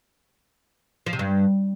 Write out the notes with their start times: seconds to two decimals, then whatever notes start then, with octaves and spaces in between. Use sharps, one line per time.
1.06 F3
1.13 C3
1.19 G2